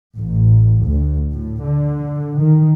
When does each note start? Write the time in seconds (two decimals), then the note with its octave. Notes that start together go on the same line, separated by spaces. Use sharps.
0.18 A1
0.85 D2
1.33 A2
1.63 D3
2.39 D#3